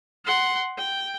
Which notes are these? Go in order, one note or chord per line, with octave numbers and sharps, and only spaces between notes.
F#5 C6
G5